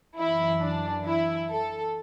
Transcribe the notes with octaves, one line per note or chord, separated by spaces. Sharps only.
F#2 E3 E4
D4
E4
A4